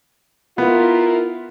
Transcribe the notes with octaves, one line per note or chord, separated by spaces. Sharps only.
B3 E4 F4 A#4